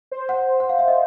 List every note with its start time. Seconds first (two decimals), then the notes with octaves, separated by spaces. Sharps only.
0.12 C5
0.29 F#5
0.60 F#5
0.69 F5
0.79 E5
0.88 D#5